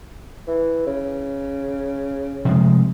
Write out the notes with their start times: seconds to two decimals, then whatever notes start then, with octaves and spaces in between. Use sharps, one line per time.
0.47 E3
0.86 C#3
2.45 C3 F3 G#3